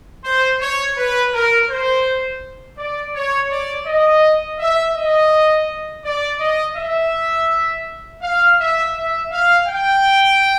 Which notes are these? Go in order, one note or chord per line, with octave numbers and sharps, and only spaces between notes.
C5
C#5
B4
A#4
C5
D5
C#5
D5
D#5
E5
D#5
D5
D#5
E5
F5
E5
E5
F5
G5